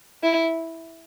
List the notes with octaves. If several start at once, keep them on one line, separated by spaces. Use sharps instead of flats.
E4